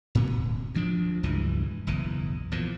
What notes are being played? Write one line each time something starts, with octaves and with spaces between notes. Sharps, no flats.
A2 C3 A#3 B3
D1
D2 F3 D4
E1 C#2 G2 E3
F#1 B1 E2 E3
E2 A#2 F3